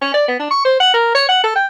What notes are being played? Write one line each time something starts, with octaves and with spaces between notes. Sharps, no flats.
C#4
D5
B3
D4
C#6
C5
F#5
A#4
C#5
F#5
A4
G5